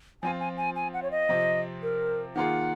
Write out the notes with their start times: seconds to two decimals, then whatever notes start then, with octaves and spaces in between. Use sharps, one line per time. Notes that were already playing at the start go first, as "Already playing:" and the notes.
0.23 F3 C4 F4 G#5
0.40 G#5
0.57 G#5
0.76 G#5
0.94 F#5
1.03 C#5
1.11 D#5
1.29 C3 F3 C4
1.83 A#4
2.35 D#3 A#3 F4 G#4 F#5